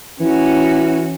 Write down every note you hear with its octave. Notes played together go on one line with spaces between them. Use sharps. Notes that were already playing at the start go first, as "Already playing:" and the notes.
E3 C#4 F#4